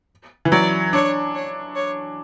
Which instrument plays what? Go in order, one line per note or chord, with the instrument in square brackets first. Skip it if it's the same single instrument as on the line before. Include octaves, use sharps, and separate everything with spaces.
[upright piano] E3
[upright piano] F#3 [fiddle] D5
[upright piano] D4 [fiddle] C#5
[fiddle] C#5
C#5